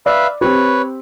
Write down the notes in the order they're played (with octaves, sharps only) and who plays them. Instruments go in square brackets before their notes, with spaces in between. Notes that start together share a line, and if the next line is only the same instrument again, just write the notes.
[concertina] B4 E5 F5 [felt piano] D5
[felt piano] C4 G4 [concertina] B4 C#5